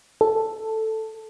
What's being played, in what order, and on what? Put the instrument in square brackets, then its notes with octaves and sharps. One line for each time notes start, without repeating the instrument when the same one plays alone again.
[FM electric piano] A4